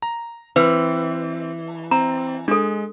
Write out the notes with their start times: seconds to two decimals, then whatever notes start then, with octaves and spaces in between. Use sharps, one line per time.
0.02 A#5
0.56 E3 C4 B4
1.91 C4 A#5
2.48 G#3 D4 A4